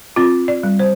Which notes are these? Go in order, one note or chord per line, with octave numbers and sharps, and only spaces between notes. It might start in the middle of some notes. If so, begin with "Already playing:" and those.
C4 F4
D5
G3
C5